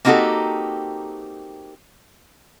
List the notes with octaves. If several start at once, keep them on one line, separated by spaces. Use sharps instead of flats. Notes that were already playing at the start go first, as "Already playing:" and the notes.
A#3 C4 D#4 F#4 G4 A4